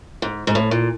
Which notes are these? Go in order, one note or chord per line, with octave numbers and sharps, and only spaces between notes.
G#2
G#2
A2
A#2